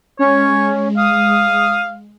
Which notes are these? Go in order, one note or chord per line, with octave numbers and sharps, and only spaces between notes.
G#3 C#4 C#5
F5 D#6